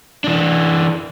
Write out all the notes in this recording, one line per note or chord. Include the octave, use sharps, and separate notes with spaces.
E3 D4